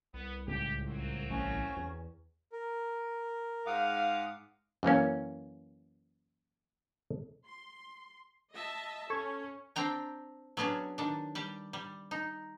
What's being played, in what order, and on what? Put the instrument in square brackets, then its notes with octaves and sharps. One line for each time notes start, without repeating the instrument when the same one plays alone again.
[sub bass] C2 [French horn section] B3
[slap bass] C#2 A2 [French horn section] G4
[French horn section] F#3 A#3 C4
[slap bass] A1 C3 [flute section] C#4 C#6
[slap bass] E2
[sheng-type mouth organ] A#4
[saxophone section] G#2 F5 [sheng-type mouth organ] F#5 D6 D#6
[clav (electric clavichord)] F#2 E3 A#3 C#4
[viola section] C6
D#5 E5 A5
[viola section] C#4 [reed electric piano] A4 C#6 G#6
[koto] C4 D4 G5 A#5
F#3 B3 C#4 D4 G#4
D#3 D4
G3 G4
G3
D#4